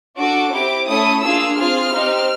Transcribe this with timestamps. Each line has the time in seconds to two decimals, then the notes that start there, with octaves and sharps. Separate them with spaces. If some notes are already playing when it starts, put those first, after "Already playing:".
0.17 D4 F#4 A4 D6
0.52 C4 E4 G4 D6
0.87 A3 C#4 E4 A4 D#6
1.22 A#3 D4 F4 G#4 E6
1.57 C4 F4 G#4 F6
1.93 C4 D#4 G4